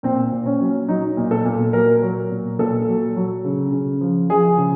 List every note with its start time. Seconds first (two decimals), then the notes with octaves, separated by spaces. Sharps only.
0.03 A#2 C4
0.32 A#2
0.46 C#4
0.60 F#3
0.88 F#3 D#4
1.17 A#2
1.31 A4
1.45 A#2
1.73 F#3 A#4
2.02 F#3
2.30 A#2
2.59 A#2 A4
2.87 F#3
3.16 F#3
3.44 C#3
3.72 C#3
4.01 F3
4.29 F3 G#4
4.58 C#3